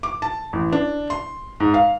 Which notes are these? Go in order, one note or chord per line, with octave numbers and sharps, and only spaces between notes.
D6
A5
A1
D4
C6
G#2
F5